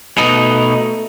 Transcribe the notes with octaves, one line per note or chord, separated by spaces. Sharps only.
B2 A3 D#4